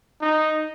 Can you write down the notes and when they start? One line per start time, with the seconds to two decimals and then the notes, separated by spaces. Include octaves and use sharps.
0.21 D#4